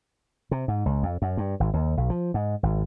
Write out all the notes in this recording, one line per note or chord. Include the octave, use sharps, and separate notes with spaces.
C3
G#2
C#2
F2
F#2
G2
G#1
D#2
B1
F3
G#2
G#1